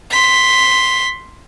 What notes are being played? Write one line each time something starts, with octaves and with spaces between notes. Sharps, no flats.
C6 B6